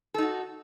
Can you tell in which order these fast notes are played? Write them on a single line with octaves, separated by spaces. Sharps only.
A4 D#4 F#4